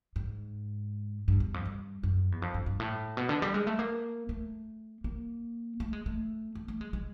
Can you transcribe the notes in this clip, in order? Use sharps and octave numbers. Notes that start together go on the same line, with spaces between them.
G#2
G2
E2
F2
G2
F#2
E2
F2
G2
G2
A2
B2
D3
G3
G#3
A3
A#3
A3
A#3
A3
G#3
A3
A3
A3
G#3
G#3